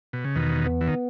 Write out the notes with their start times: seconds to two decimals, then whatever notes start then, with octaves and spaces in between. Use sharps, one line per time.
0.13 B2
0.25 C#3
0.36 E2 B2 D#3
0.66 B3
0.81 E3
0.87 D#3